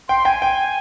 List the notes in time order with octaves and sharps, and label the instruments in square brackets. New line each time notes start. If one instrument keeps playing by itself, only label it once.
[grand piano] G5 [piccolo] C6
[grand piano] G5 [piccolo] G#5
[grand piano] G5